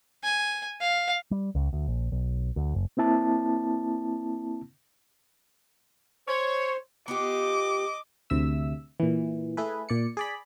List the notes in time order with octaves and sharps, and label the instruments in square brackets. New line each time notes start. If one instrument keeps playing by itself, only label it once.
[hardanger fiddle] G#5
F5
[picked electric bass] G3
C#2
D2
A#1
B1
D2
F#1
[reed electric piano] A#3 C4 E4 A5
[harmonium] C5 [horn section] C#5
[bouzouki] B3 F4 G4 [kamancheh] D#5 D6
[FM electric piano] D2 C3 E5 E6
A#2 E3
A3 E4 G#4 A4 B4
A#2 D5 C#7
G#4 D5 B5